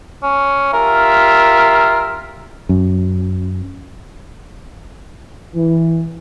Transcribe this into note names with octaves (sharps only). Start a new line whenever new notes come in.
C#4
F4 G4 A#4 E5
F#2
E3